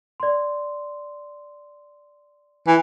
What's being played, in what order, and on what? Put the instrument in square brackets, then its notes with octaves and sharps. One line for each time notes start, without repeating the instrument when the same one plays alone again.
[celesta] D5 C6
[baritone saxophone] E3